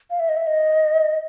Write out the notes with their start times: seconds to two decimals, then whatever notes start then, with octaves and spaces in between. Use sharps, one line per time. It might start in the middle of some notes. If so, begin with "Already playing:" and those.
0.10 F5
0.20 E5
0.29 D#5
0.37 E5
0.47 D#5